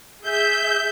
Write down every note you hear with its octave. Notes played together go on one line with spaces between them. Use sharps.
G#4 E5 G6